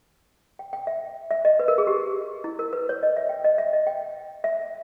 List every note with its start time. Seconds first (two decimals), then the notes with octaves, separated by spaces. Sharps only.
0.59 G5
0.73 G5
0.87 E5
1.31 E5
1.45 D#5
1.59 B4
1.68 A#4
1.78 G#4
1.87 G4
2.44 E4
2.59 A#4
2.73 B4
2.89 C#5
3.03 D#5
3.17 E5
3.29 G5
3.44 D#5
3.58 E5
3.73 D#5
3.87 G5
4.44 E5